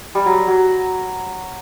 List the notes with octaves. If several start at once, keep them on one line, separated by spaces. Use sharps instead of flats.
G3
F#3
F#3